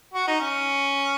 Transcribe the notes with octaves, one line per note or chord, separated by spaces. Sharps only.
F#4
D#4
C#4